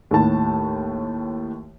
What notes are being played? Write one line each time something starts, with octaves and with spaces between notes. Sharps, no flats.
D#2 A2 A5